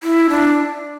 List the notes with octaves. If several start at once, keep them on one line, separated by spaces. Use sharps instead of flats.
E4
D4